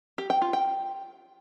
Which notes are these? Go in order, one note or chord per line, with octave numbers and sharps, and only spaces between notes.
G4
G5
F4
G5